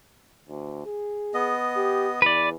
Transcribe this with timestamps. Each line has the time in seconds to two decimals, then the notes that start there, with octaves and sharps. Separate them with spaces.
0.49 D2
0.86 G#4
1.34 B3 D#5
1.76 G4
2.22 E2 B4 D5